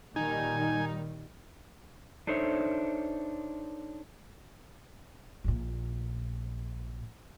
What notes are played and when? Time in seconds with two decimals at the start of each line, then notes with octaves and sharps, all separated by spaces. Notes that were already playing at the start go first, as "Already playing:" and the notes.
0.16 A#2 D#3 G3 D#4 G#5
2.27 D4 D#4 A4 C5 C#5 E5
5.44 A#1 A#2